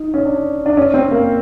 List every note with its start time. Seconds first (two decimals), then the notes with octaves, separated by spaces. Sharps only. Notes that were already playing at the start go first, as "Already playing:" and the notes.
Already playing: D#4
0.14 C#4
0.25 D4
0.66 D4
0.77 C#4
0.94 C4
1.11 A#3